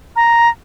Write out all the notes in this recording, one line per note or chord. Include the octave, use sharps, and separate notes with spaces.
A#5